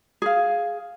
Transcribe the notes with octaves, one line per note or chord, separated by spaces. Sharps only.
G#4 F5